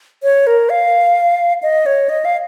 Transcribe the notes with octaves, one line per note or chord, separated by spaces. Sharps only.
C#5
A#4
F5
D#5
C#5
D#5
F5